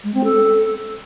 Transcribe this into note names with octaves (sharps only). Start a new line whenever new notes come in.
G#3
C4
A4